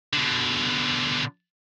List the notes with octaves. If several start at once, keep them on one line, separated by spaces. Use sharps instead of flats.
B2 D3